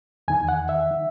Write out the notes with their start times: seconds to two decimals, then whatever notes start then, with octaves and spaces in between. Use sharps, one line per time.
0.28 E2 D#3 G#5
0.49 F#5
0.69 E5
0.91 D#3